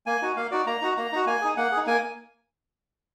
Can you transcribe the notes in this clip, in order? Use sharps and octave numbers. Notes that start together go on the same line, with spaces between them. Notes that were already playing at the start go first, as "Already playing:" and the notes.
A#3 G#5
D#4 F#4
A#3 F5
D#4 F#4 D5
A#3 A#5
D#4 F#4
A#3 A#5
D#4 F#4
A#3 G#5
D#4 G#4
A#3 F#5
G#4
D#4
A#3 G#5